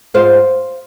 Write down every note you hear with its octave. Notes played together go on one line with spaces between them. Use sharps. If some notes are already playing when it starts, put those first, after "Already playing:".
G#2 G#3 F4 C5 F5